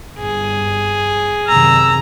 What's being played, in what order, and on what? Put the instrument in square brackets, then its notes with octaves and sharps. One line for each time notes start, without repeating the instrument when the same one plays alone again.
[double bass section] G1 G2 [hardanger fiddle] G#4
[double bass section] F#2 C3 D#3 [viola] A#5 [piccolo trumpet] E6